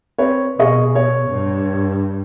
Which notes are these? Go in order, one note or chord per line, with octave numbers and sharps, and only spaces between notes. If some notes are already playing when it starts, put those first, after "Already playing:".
C4 B4 C#5
B2 G#4 D#5 C#6
C#5
G2